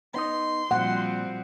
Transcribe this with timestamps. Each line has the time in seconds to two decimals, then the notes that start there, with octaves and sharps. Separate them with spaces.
0.14 B3 D#4 D#5 C6
0.71 A#2 F3 G3 C4 F#5